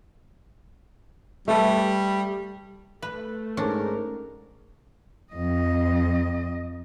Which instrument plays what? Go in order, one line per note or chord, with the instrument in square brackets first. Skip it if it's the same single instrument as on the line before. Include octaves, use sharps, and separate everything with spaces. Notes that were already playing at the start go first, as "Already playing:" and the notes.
[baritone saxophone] G3 [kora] A3 A4 B4
[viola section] A3 [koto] B4
[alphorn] G#2 [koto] C#4 D4 [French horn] A#4
[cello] F2 D#5